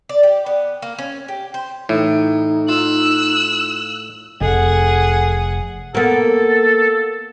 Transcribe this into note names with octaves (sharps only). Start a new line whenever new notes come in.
D5
G4
B3
A#3
C#4
G4
C5
A2 E3 D#4
F4 E6 F#6
F1 F2 G#4 A4 F#5
A#3 B3 A4